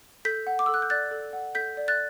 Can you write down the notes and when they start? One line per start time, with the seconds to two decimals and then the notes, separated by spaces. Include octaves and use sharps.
0.25 A4 G6 B6
0.47 F#5
0.59 D6
0.66 A4 E6
0.74 F#6
0.82 G6
0.90 D5 F#6 A6
1.11 A4
1.33 F#5
1.55 A4 G6 B6
1.77 D5
1.88 F#6 A6